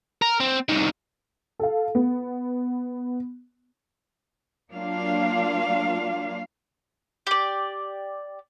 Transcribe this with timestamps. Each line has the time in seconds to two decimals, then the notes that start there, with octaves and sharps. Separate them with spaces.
0.22 A#4
0.40 C4
0.69 C2 D#3
1.59 A4 F5
1.95 B3
4.71 F#3 A#3 D4 F4 F5
7.27 G4 D5